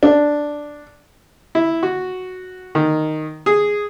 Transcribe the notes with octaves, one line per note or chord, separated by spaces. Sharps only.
D4
E4
F#4
D#3
G#4